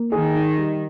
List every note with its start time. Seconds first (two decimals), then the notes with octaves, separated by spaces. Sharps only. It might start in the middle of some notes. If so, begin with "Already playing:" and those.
Already playing: A#3
0.12 D#3 G#4
0.34 D#4
0.58 G3